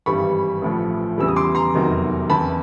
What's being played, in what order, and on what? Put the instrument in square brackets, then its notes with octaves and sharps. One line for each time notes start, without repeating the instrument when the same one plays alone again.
[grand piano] G#1 G2 E3 G3 B5 C#6
A1 A2 F3
E2 C#3 E3 G3 E6
D#6
C6 D6
A#5 C6
F1 E2 C3 D#3 F#3
E2 C#3 E3 A5 B5